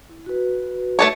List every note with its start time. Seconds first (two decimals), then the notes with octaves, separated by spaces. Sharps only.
0.10 E4
0.26 F#4 B4
0.99 A3 A4 C#5